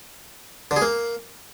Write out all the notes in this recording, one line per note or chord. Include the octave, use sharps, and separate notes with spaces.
D3
G#4
A#3